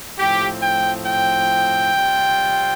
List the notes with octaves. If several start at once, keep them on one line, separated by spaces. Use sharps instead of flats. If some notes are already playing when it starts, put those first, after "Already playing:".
A2 F3 C4 G4
G5
G5
C3 G3 C4 F4